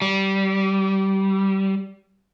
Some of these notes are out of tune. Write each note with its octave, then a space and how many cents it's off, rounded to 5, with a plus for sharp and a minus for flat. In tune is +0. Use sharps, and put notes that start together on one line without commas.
G3 -20